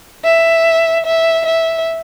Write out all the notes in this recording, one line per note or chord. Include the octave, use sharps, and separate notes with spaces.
E5
E5
E5